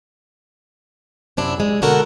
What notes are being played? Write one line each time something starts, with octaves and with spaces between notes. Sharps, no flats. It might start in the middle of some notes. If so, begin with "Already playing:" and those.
F#2 C3 D4 E4
G#3
B2 D3 F#4 A4 A#4